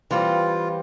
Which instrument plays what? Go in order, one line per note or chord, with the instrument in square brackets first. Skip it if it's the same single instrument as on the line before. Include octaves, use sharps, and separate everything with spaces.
[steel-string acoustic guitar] E3 G3 C4 G4 [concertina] F4